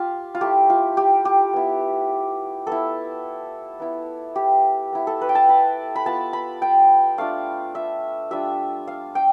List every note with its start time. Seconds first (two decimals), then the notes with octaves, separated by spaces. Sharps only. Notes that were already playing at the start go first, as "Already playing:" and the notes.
Already playing: F4 G4
0.35 F4
0.41 A3 E4 G4
0.70 F4
0.97 G4
1.25 G4
1.53 B3 E4
2.67 B3 E4 A4
3.80 B3 E4
4.36 G4
4.93 B3 E4
5.07 A4
5.21 B4
5.29 G5
5.35 A5
5.49 B5
5.96 B5
6.06 B3 F4 A5
6.33 B5
6.62 G5
7.18 A3 D4 F4 F5
7.75 E5
8.31 G3 D4 F4 E5
8.87 F5
9.15 G5